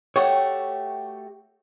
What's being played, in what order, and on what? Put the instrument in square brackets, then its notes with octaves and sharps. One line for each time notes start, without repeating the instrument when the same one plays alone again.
[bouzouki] A3 F#4 G4 [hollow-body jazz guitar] C#5